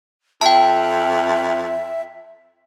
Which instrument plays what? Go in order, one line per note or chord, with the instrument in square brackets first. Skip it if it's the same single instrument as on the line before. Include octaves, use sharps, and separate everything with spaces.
[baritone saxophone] F2 [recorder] E5 [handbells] G5 A5